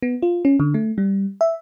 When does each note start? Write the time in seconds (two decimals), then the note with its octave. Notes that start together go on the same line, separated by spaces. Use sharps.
0.03 B3
0.22 F4
0.45 C#4
0.60 D3
0.74 A3
0.98 G3
1.41 E5